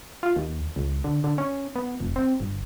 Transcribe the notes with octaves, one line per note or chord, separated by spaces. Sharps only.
F4
D#2
C#2
D3
D3
C#4
B3
F1
C4
G1